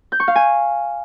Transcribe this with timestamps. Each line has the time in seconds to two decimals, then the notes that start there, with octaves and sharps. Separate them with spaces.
0.12 G6
0.20 C#6
0.28 F5
0.36 G#5